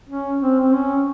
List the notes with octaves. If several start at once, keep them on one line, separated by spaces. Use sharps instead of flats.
C#4
C4
C4
C#4